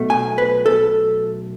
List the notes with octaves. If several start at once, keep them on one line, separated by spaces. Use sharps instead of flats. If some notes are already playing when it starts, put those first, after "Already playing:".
Already playing: B1 B2 A3
G#5
B4
A4